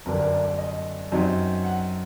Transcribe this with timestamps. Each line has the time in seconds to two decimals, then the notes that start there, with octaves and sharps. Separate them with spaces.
0.06 G1 F#2 D3 G3 D4 A#4
0.19 A#4
0.32 D5
0.45 D5
0.58 D#5
1.12 F#2 F#3 C4 D#4
1.64 F#5